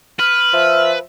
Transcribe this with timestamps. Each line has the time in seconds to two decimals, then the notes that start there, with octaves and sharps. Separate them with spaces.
0.19 B4 F6
0.53 F3 E5